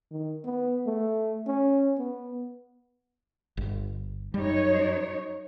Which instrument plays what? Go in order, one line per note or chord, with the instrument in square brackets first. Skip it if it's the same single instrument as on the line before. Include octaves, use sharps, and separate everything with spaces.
[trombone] D#3
B3
A3
C#4
B3
[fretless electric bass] G1
[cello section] F#2 D#4 C#5 [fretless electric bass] G3